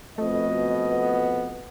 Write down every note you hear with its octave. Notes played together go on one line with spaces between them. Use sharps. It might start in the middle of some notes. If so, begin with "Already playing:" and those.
F2 B2 A3 D#5
B3